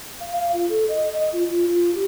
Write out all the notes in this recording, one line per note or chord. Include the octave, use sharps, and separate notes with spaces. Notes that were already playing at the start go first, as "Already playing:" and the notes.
F5
F5
F4
A4
D#5
D#5
F4
F4
F4
G4